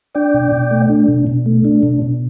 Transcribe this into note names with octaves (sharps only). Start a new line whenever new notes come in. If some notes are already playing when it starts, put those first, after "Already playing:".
D4 D5 G5
B2
B2
A3
D4
B2
B2
A3
D4
B2
B2